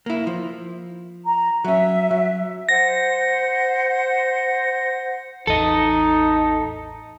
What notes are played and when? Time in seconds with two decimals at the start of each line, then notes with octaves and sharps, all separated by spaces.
0.06 A#3 E4
0.27 F3
1.25 A#5
1.64 F#3 C#4 E5
2.11 F#3
2.69 C5 F#5 A#6
5.47 A1 E2 D#4 A4 D#5